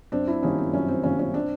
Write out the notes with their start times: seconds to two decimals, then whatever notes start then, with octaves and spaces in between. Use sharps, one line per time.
0.12 F#2 C4 D4
0.27 D4 E4
0.43 D#3 G3 A#3 C#4 D#4
0.58 C4
0.73 F#2 C#4
0.88 C4
1.03 D#3 G3 A#3 C#4
1.19 C#4
1.34 C4 D4